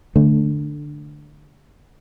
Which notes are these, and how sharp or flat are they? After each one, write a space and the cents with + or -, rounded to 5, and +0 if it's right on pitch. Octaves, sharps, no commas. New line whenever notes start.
D3 +10 A3 +0